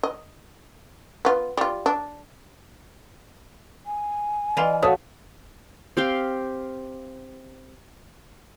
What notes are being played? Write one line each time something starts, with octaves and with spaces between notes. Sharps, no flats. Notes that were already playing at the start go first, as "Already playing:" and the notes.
D#5
B3 F4
G3 F4
D4
G#5
E3 F4 D5 D#5
A3 F#4 C#5 F5 F#5 D#6
C4 G4 F5 G5